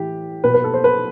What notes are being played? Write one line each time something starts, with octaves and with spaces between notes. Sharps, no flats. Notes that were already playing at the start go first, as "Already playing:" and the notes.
Already playing: A2 E3 G4
B2 B4
B4
A4
C5
B4